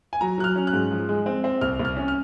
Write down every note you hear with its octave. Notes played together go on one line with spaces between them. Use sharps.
G#5
F#3 A#5
F#3 F#6
F6
C#4
F#6
G#2
F3
G#3
C4
C4
C2 F6
C2
F6
C#4
F6